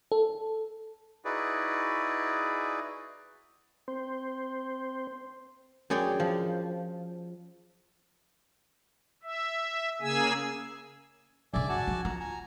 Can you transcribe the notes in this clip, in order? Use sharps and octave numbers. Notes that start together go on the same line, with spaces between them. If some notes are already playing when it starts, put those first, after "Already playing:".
A4
D#4 E4 F#4 G#4 B4 D5
C4 C5
F#2 G#4 C#5 D5 G5
F3
E5
C#3 A#3 G#4 G#5 E6
G2 C#3 D5 E5 G#5
F#4 G#5 A5
F3
F4 A#5
G#5 A#5